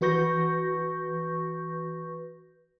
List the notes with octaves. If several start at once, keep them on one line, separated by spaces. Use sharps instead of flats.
E3 F#4 B4 C#6 G6 A#6